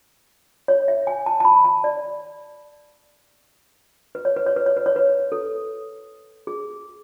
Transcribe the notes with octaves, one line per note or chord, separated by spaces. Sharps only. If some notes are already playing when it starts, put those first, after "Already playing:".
C#5
E5
G#5
A5
A5
B5
A5
D5
B4
C#5
B4
C#5
B4
C#5
B4
C#5
B4
A4
G#4